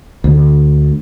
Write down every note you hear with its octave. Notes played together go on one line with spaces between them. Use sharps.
D2